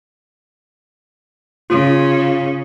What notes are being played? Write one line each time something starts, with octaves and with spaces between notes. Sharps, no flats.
C#3 F4